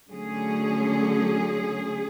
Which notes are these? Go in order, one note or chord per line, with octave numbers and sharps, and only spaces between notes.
D3 F#3 A3 C#4 G#4